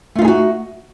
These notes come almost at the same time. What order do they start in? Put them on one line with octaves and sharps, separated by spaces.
A3 F4 D#4 G#4 F#4